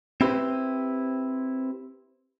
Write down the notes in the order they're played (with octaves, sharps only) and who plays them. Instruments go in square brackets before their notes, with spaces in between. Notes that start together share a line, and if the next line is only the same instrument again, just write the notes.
[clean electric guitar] C4 E4 G4 B4 C5